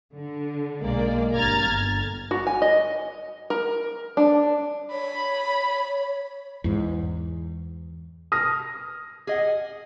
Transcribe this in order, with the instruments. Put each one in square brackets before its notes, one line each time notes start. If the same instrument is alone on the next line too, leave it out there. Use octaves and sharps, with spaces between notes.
[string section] D3
B1 G#3 A#3 D5
G#1 G2 A#5 F6 G#6 A6
G1
[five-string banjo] F#4
G#5
D#5
A#4
D4
[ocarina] C#5 [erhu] B5
[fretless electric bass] E2 G#2
[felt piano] D#6 F6 A#6
[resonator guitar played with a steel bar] G#4 D#5 F#5